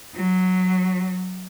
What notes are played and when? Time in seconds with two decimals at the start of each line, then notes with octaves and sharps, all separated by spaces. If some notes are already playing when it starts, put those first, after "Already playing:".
0.15 F#3